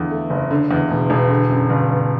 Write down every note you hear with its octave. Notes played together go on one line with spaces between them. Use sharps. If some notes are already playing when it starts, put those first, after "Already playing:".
Already playing: E2 D3
A3
F#1
D3
E2
E1
E1
D3
F#2
G1
G1